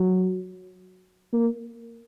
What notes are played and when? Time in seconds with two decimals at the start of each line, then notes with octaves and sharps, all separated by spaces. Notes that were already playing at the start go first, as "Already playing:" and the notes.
Already playing: F#3
1.33 A#3